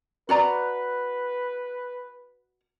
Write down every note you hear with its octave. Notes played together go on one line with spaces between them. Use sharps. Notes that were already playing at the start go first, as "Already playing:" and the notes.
F#4 B4 D5 A#5